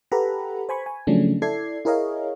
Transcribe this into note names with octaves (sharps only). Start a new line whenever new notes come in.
G4 A4 B4 F#5 A#5 B5
C5 G#5 B5 C#6
G#5
C#3 F3 F#3 A3 C#4 D4
E4 A4 D5 G#6 C7
E4 G#4 A#4 C#5 D#5 F5